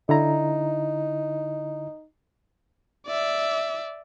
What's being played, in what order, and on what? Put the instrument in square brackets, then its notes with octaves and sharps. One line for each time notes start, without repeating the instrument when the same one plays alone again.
[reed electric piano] D3 E4 A#5 [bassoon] D#4
[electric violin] D5 E5